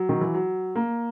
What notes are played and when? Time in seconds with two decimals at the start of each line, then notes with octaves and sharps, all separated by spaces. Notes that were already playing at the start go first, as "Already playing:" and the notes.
Already playing: F#3
0.09 D#3
0.21 E3
0.34 F#3
0.75 A#3